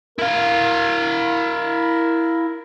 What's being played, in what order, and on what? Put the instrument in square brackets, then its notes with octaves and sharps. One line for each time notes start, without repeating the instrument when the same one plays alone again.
[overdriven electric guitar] E4 F5 [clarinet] A#4